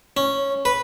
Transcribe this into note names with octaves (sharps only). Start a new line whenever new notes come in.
C#4
B4